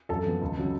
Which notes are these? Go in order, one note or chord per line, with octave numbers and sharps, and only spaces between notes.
F#2 A4 A5
F3 B3
C#2
C#3 F#3